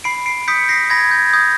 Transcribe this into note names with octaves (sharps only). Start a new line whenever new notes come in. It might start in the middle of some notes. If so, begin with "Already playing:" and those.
B5 C7 D7
C7 D7
D#6 G6 B6 C#7
A#6 C7
B5 G#6 A#6
G6
G#6
D#6 G6